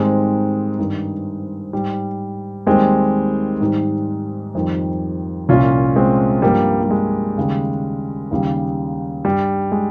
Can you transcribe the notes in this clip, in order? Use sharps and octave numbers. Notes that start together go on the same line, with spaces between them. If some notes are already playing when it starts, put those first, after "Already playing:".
Already playing: G#2 D#3 G3 G#3 C4
G2 D#3 G3
G#2 G3
D#2 D#3 G3 G#3 C4
G#2 D#3 G3
F2 D#3 G3
C2 A#2 F3 C#4 F4
G#3 C4
G2 F3 G3 A#3
G3
G#3
D#2 C#3 G3
D#2 C#3 G3
G2 G3
G#3